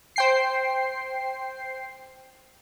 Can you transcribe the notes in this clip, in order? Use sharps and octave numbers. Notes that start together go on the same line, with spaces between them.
C5 G5 C7